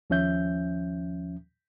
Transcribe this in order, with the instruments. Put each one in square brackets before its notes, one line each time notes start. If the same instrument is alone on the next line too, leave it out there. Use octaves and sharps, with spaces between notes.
[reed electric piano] D#2 F3 C#4 E5 G6